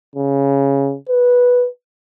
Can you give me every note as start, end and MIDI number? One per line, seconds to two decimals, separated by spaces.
0.16 0.96 49
1.09 1.67 71